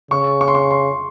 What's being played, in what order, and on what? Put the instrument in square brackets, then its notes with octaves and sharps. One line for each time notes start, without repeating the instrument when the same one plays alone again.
[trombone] C#3 [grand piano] C#6
[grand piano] C#6
C6
C#6
C6